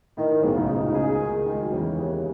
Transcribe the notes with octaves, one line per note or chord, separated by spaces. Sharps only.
A2 D#3
A2
B1 G#2 B2
C#2 C#3
C#3 D#4
B2
C#2 C#3
G#4
D#3
D#3 G#3
F#3
E2 C#3 E3
D#2